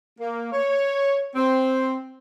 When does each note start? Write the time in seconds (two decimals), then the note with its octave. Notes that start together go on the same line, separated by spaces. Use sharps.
0.19 A#3
0.53 C#5
1.35 C4